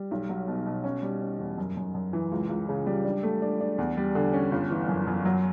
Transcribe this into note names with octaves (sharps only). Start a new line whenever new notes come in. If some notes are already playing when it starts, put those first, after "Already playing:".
Already playing: G3
B1
F#3
B2
B2
C#4
G3
C#4
E2
F#2
F#2
F#2
E3
C#2
C#2
C#3
G3
D4
A3
D4
D4
E2
G3
D3
C#4
G1
E3
F#2
F#2
F#3